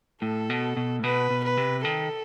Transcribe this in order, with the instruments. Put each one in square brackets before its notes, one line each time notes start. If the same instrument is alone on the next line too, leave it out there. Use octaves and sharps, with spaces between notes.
[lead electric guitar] A2 [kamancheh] A4
[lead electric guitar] B2
B2
A2
[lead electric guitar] B2 [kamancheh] B4
[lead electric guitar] B2
[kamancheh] B4
[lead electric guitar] C3
[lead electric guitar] D#3 [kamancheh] A4